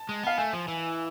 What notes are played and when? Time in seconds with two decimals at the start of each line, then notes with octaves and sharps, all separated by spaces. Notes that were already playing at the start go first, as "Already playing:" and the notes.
Already playing: A5
0.09 G#3
0.23 B3 F5
0.38 A3 G#5
0.53 F3
0.68 E3